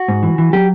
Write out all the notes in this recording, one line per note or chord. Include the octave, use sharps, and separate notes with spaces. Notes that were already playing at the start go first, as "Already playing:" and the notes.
Already playing: F#4
G#2
E3
E3
F#3 G4